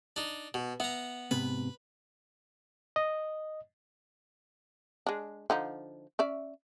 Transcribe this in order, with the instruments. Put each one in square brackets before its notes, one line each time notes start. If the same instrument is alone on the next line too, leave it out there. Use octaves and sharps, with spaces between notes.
[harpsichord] D4 D#4
B2
[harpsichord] B3 A#5 [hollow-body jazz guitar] E5
[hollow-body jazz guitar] G#2 C3 B3 [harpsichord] B4
[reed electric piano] D#5
[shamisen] G#3 D4
D3 F3 D#4
C#4 D5 E5